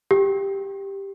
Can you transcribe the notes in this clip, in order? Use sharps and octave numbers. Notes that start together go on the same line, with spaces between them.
G4